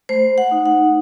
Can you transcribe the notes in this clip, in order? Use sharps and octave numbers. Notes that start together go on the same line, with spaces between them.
A3 C5
F#5
D#4
F#5